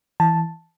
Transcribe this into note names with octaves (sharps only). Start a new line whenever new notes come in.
E3 A5